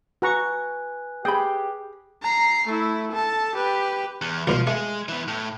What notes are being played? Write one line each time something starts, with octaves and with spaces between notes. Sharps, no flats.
F#4 B4 G#5 A#5 C#6 F#6
G4 G#4 G5 B5
A#5 C7
A3 E4
A4 A5
G4 B4
E2
C#2 B2 F3 C6
G#3 A3
E3 B3
A2